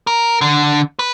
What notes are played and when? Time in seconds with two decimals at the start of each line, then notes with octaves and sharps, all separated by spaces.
0.07 A#4
0.41 D3
0.99 B4